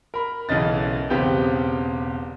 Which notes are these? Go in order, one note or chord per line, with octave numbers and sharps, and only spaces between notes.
A#4 B5
B1 C#3 E3 D#5 A6
E1 C#3 B3 C4 G4 G5